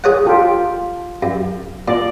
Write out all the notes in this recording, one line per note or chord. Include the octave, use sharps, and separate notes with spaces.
G#4 C#5 F#5
F4 G4 A4
F#2
A#2 D5